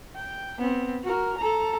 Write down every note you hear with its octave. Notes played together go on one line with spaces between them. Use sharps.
G5
B3 C4
F#4 A#4
A4 A#5